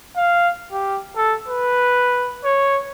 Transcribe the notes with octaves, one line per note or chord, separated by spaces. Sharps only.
F5
G4
A4
B4
C#5